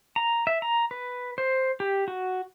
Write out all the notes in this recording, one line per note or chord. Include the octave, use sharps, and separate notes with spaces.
A#5
E5
A#5
B4
C5
G4
F#4